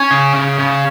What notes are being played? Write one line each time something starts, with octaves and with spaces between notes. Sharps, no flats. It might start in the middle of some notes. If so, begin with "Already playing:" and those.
Already playing: C#4
C#3
C#3
C#3